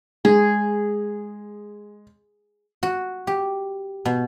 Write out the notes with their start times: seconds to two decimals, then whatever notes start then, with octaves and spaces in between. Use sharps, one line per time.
0.25 G#3 G#4
2.83 F#4
3.27 G4
4.05 B2